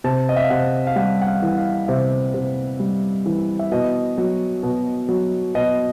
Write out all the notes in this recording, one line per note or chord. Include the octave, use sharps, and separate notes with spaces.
C3 A5
D#5
E5
F5
C3 F#5
F5
G3 F#5
F#5
F5
E3
F#5
F5
C3 E5
C3
G3
E3
E5
B2 D#5
F#3
B2
F#3
B2 D#5